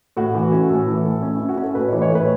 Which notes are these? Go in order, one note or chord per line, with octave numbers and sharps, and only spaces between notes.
A2 F#4
E3
C#4
A2 A4
E3
A2
C#4
C#4 E4
F#4
C#4 A4
A2 B4
E3 C#5
C#5
A2 B4